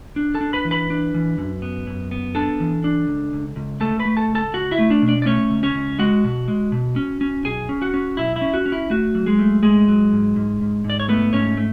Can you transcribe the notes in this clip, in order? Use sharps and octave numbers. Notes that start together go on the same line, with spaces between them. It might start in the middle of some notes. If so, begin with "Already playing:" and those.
D4
A4 A5
D4
B4 B5
E3
B4 B5
D4
E3
F#2
B3
F#2
B3
D4 A4 A5
E3
D4
C#2
C#2
C#2
A3 A4 A5
B4 B5
A3
A4 A5
C#2
A4 A5
C#2 F#4 F#5
E4 E5
A3
D4 D5
B2
D4 D5
D5
A3 C#4 C#5
C#2
C#4 C#5
C#2
G#3 F#4 F#5
B2
G#3
B2
C#4
C#4
B1 G#4 G#5
C#4
F#4 F#5
C#4
B1 E4 E5
E4 E5
C#4
F#4
C#4
E4
A3 F#4
F#3
G#3 G#4
A3
G#2 G#3 G#4
F#3
G#2
G#2
G#2
G#2
D5
C#5
A3 B3 B4
G#2 C#4 C#5
A3